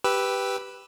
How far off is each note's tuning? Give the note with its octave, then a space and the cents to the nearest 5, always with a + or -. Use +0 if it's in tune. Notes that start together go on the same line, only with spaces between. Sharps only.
G4 +0 B4 +0 E6 +0